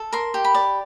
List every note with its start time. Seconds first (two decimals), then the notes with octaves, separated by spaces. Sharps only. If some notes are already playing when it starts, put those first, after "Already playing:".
Already playing: A4
0.13 A#4 C6
0.34 G4
0.44 B5
0.54 D5